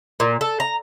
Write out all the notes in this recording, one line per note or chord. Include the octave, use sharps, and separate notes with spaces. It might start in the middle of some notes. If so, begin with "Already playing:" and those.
A#2
A4
A#5